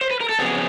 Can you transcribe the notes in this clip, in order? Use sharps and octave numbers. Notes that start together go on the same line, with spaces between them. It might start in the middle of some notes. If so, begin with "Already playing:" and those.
C5
B4
A#4
A4
F2 C#3 F#3 B3 G#4